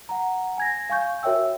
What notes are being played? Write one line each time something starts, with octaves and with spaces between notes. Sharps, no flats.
F#5 A#5
G#5 G#6 A#6
F5 G#5 C#6 G6
F#4 A#4 C#5 E5 G5 E6